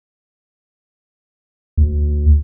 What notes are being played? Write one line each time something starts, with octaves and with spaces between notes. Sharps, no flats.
D2